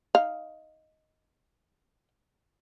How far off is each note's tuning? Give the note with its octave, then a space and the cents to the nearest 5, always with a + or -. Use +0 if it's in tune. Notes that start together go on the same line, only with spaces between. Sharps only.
D#4 +5 F5 +0